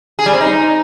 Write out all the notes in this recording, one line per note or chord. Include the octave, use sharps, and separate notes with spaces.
G#4
G3
C4
D#4